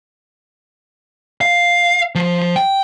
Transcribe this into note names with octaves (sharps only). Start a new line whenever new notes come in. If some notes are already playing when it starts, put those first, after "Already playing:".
F5
F3
G5